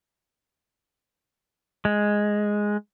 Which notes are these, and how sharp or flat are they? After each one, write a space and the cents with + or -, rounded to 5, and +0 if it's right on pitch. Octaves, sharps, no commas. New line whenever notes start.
G#3 +0